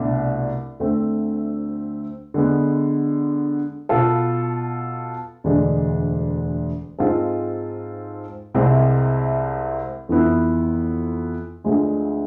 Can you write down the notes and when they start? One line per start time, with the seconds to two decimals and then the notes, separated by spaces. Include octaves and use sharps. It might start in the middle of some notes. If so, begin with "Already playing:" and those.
Already playing: C2 B2 A3 D4
0.80 D2 D3 A3 C4
2.34 D3 G#3 B3
3.89 B2 B3 F4 A4
5.44 E1 D2 D3 G#3 D4
6.99 G#2 G#3 C4 F4 A4
8.54 C2 C3 G#3 C4
10.09 F2 E3 B3 E4
11.64 D2 D3 F3 G#3